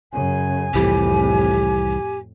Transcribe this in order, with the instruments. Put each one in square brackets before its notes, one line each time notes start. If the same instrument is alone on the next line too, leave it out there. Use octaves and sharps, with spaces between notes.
[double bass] F#2 C#3 [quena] G#5
[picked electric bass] C2 E3 G3 [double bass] F2 A2 [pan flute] G4